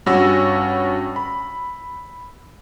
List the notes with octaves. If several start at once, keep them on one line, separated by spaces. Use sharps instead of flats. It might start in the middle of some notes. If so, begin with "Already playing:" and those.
G2 G3 C#4 F#4 E6 A#6
B5